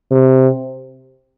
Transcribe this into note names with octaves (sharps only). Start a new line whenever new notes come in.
C3